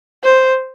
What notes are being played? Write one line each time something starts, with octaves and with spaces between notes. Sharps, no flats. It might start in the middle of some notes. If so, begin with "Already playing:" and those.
C5